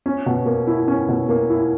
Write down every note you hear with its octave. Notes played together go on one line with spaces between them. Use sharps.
C#4
B2
A#3
E4
C#4
B2
A#3
E4